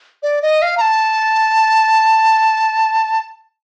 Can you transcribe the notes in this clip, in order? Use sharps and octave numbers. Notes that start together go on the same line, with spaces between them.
D5
D#5
F5
A#5
A5